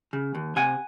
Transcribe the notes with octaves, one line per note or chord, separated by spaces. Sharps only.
C#3
D#2
C3 F#5 G#5